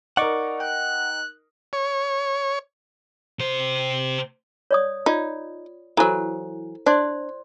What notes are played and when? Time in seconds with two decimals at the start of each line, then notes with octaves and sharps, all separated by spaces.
0.17 D#4 A#4 D5 F#5 C#6 D6
0.60 G5 F#6
1.73 C#5
3.39 C3 C5
4.71 C#5 D5 D#6
5.06 D#4 F4 D5
5.97 E3 F#3 E4 A4 C5
6.86 D4 C5 D5 C6